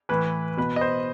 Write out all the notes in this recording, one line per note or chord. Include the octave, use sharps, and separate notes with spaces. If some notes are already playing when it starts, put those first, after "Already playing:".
A2 E3 B4
B2 B4
D#5
C5